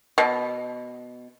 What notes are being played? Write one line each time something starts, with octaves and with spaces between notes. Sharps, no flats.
B2